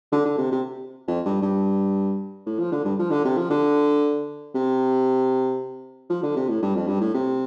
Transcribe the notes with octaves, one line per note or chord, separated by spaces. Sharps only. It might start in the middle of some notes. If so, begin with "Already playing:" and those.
D3
D3
C3
C3
F2
G2
G2
A2
F3
D3
G2
F3
D3
C3
F3
D3
C3
F3
D3
C3
A2
G2
F2
G2
A2
C3